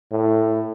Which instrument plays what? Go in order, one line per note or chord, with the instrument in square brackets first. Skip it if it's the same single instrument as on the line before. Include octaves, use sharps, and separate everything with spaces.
[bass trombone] A2